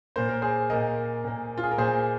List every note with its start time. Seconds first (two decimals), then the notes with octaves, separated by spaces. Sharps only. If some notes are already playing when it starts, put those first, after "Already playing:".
0.16 A#2 A#3 C5
0.29 A#4
0.42 G#4 C5
0.70 A#2 A#3 A#4 D#5
1.25 A#2 A#3
1.58 F4
1.63 G#4
1.71 A#4
1.78 A#2 A#3 G#4 C5